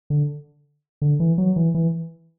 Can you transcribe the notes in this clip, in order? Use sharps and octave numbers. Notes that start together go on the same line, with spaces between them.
D3
D3
E3
F#3
E3
E3